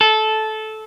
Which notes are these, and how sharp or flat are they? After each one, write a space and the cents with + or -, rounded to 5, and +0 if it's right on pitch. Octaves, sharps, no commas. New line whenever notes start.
A4 -15